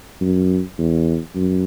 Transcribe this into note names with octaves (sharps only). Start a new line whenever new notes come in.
F#2
E2
F#2